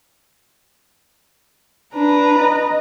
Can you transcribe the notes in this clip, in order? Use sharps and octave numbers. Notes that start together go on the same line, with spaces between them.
D4 B4 A#5
D#5